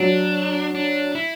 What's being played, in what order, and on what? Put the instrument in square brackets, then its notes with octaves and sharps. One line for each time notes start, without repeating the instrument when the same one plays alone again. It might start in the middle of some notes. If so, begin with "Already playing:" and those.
Already playing: [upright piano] F#3 [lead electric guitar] D4
[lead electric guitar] D4
E4